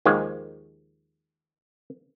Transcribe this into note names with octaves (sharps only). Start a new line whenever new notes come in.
D#2 D#3 F3 G#3